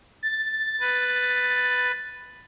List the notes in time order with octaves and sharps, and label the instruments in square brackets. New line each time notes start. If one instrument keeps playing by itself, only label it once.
[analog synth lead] A6
[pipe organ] B4